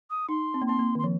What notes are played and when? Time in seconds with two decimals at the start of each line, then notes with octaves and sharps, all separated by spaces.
0.10 D#6
0.29 D#4 C6
0.54 C4
0.62 A#3
0.67 C4 C6
0.79 A#3
0.95 D#3 C6
1.04 F3